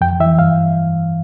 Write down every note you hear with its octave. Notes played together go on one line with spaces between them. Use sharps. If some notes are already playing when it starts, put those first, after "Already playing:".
F2 G5
E3 E5
G2 F5